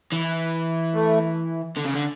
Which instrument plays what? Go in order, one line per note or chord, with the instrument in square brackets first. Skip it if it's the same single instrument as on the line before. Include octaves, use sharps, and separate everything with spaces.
[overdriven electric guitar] E3
[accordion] A3
[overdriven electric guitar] D3
C#3
D3